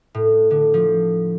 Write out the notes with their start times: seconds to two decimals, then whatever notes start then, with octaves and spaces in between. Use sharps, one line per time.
0.15 A2
0.51 D3
0.74 F3